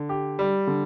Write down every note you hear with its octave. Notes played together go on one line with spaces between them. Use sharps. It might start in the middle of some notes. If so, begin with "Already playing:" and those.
Already playing: D3
G4
G3
D3